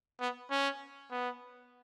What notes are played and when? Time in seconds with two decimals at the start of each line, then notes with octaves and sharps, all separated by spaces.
0.20 B3
0.51 C#4
1.11 B3